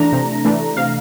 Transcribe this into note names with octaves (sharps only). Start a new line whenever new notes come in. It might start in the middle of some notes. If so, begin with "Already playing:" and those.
Already playing: E3 A3 D4 A#5
C3
E3 A3 D4
C3 F5